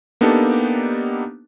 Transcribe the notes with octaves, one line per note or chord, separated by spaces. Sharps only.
A#3 B3 D4 D#4 G4 A4